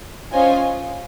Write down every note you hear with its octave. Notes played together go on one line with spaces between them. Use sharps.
C#4 F4 C5 D#5 G#5